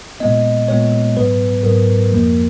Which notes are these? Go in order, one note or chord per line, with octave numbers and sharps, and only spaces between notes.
A#2 G#3 B3 D#5
A#2 G#3 B3 C#5
G#2 F#3 B3 B4
G#2 F#3 B3 A#4
F2 F3 A#3